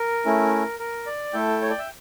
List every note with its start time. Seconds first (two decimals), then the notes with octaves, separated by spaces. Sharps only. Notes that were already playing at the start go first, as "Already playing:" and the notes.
Already playing: A#4
0.25 A3 C#4 E4
0.79 A#4
1.06 D5
1.33 A3 E4 A4 G5
1.62 C#5
1.70 D5
1.79 E5